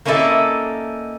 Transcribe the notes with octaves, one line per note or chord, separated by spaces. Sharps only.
A#3 C#4 D#4 E4 A4 D5